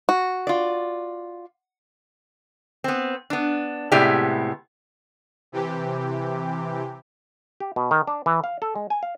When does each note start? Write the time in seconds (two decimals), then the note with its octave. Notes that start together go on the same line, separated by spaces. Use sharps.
0.09 F#4
0.47 F4 D5
2.84 B3 C4
3.30 B3 D4
3.92 A2 C3 G#3 B3 G4 D5
5.52 C3 E3 G4
7.60 G4
7.76 B2
7.91 D#3
8.07 D4
8.26 E3
8.44 F5
8.62 A4
8.75 G#3
8.90 G#5
9.03 F5